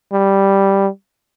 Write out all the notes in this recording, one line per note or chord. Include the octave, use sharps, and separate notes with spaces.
G3